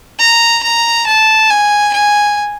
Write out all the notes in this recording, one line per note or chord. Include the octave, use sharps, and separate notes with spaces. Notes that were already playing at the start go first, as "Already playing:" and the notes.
A#5
A#5
A5
G#5
G#5